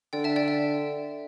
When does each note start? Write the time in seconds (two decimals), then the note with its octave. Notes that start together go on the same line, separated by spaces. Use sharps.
0.13 D3 D5 G5
0.24 E5 A5
0.36 D5 G5
0.48 E5